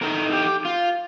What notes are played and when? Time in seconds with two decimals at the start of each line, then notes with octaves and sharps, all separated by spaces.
0.01 A2 A3 D#4 A#4
0.32 G4
0.65 F4